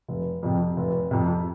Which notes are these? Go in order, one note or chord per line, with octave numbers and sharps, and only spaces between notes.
F1
F2 C3
F1
F2 C3